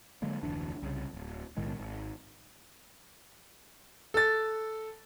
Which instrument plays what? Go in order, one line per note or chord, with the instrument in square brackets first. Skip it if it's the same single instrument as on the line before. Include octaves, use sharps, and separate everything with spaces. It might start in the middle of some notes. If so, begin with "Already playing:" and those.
[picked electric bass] D3 F#3 G#3 A#3
F1 D2 E3 D4
C2 C#3
D1
B1 A2 D#3 G#3
G#1
[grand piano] A4 A6